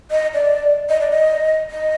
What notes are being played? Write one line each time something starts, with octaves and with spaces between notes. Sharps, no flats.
D#5
D5
D#5
D5
D#5
D#5